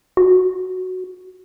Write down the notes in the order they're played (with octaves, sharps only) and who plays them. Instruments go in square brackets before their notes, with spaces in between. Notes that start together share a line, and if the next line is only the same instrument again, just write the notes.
[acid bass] F#4